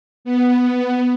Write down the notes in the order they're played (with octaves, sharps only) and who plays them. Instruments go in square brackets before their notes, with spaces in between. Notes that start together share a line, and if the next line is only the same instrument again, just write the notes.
[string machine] B3